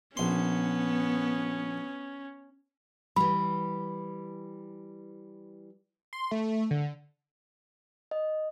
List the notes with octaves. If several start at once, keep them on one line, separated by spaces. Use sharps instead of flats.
A#1 B3 C#4 C6
E3 G3 B5
C6
A3
D3
D#5